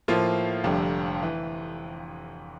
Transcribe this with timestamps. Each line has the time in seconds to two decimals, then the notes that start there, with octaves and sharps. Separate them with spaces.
0.08 A2 F3 A#3 F4
0.64 F1 F2 D3 G3
1.23 E3